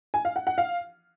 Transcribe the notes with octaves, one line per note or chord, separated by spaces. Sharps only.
G#5
F5
F#5
F#5
F5